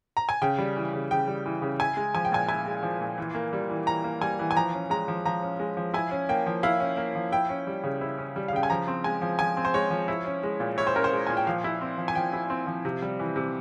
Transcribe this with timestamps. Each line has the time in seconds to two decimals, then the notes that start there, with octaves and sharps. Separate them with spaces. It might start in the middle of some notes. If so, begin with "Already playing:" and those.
0.17 A#5
0.29 G#5
0.42 C#3 G5
0.58 G3
0.76 E3
0.93 C#3
1.11 C#3 G5
1.28 G3
1.46 E3
1.62 C#3
1.80 E4 G#5
1.97 G#3
2.14 F3 G#5
2.25 G5
2.32 A#2 G#5
2.48 E4 G#5
2.66 G#3
2.83 F3
3.01 A#2
3.18 E3
3.35 A#3
3.53 G3
3.69 E3
3.87 E3 A#5
4.04 A#3
4.21 G3 G#5
4.39 E3
4.51 G#5
4.55 F3 A#5
4.73 C#4
4.90 G#3 A#5
5.08 F3
5.26 F3 A#5
5.42 C#4
5.60 G#3
5.77 F3
5.94 E4 G#5
6.11 C#4
6.29 A#3 G5
6.46 F3
6.63 E4 F5
6.80 C#4
6.97 A#3
7.15 F3
7.32 E4 G5
7.49 C#4
7.67 G3
7.84 C#3
8.01 E4
8.18 C#4
8.36 G3
8.48 F5
8.53 C#3 G5
8.63 G#5
8.70 F3 A#5
8.88 C4
9.04 G#3 G#5
9.21 F3
9.39 F3 G#5
9.57 C4
9.65 C5
9.74 G#3 C#5
9.91 F3
10.08 E4
10.26 C#4
10.43 G#3
10.60 A#2
10.78 E4 C#5
10.87 C5
10.94 C#4 A#4
11.04 C5
11.13 G#3
11.27 A#2 G#5
11.37 G5
11.47 F3 F5
11.64 E4
11.81 C4
11.98 F3
12.08 G#5
12.15 F3 G5
12.33 E4
12.50 C4
12.67 F3
12.85 C3
13.02 G3
13.20 E3
13.36 C3